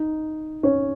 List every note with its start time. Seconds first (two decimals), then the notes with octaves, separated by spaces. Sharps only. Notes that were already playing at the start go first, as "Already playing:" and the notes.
Already playing: D#4
0.63 C#4